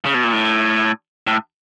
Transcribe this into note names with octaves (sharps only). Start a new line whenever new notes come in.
C#3
B2
A#2
A2
A2